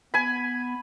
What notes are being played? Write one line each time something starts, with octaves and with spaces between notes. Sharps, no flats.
B3 G#5 B5